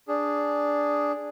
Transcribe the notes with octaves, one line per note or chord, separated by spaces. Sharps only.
D4 G#4